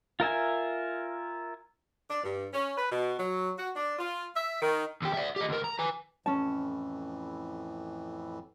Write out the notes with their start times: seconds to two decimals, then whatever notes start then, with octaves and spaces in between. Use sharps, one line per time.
0.20 F4 A#4 E5 G#5
2.09 D4
2.23 G2
2.53 C#4
2.76 B4
2.91 B2
3.18 F#3
3.57 F#4
3.75 D4
3.99 F4
4.35 E5
4.61 D#3
5.02 D#2 G4
5.14 D5 E5
5.36 G4 D#5
5.49 D2 A#4
5.64 A#5
5.79 B4 G#5
6.26 F2 A2 E3 C#4 A5